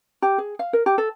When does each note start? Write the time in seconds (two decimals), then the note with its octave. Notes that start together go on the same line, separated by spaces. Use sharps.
0.22 G4
0.38 G#4
0.59 F5
0.73 A#4
0.86 G4
0.98 A4